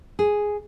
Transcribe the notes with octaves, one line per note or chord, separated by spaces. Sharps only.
G#4